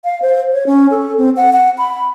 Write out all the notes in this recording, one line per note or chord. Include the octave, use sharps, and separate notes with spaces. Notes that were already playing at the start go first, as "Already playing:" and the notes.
F5
C5
C#5
C#4
A4
C4
F#5
F#5
B5